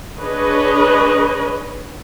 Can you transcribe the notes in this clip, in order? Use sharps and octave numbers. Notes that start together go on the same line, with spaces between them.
D4 G#4 B4 C#5 D#5